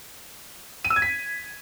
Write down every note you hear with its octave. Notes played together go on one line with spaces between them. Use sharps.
D#7
E6
G#6
B6